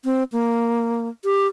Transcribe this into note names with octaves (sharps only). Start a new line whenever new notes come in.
C4
A#3
G4